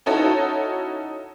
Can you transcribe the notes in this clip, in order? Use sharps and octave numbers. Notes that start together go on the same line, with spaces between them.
C#4 D#4 E4 F#4 A4 C#5